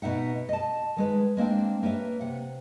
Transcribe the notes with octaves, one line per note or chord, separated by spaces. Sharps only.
B2 D#4 E5 F#5
D#5 A5
D#3 G#3 B4
G#3 A#3 C4 D4
A#3 B4 C#5 E5
C3 F#5